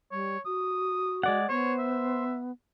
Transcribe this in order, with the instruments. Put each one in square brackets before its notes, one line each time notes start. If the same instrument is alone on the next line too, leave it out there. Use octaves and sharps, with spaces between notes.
[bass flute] G3 [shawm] C#5
[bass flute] F#4 [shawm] D#6
[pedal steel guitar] G#3 D5 F#5
[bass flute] B3 [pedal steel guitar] C5 [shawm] C#5
[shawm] E5